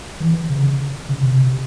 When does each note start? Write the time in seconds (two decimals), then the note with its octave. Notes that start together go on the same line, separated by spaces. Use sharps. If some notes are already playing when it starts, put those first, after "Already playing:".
0.20 E3
0.49 C#3
1.09 C#3
1.23 C3